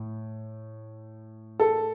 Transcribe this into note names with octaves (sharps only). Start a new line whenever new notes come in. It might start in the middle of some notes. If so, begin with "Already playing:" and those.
Already playing: A2
A4